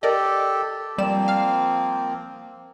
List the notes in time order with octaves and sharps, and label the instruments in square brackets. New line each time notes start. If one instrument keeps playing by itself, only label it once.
[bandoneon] G4 A4 [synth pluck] A#4 D5 D#5
[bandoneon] F3 A#3 C4 [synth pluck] G3 D5 E7
[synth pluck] F5 F6